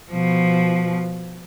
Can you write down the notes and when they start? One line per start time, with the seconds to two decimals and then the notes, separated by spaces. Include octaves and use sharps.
0.12 B2 F3